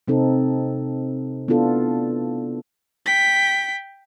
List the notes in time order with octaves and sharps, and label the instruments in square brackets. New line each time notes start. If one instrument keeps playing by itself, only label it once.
[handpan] C3 C4 D#4 A4
B3 D4 E4 F4 A4
[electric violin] G5 B6